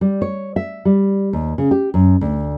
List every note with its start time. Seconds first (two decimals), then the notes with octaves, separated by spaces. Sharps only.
0.01 G3
0.22 C#5
0.56 E5
0.85 G3
1.33 D#2
1.58 C#3
1.71 G4
1.94 F#2
2.21 D2